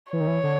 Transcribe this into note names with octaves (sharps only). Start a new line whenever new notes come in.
E3 C#5
D#3
E3
D3